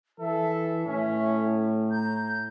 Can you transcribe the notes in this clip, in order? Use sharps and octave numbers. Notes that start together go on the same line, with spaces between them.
E3 A4 E5
A2 C#4
A#5 G6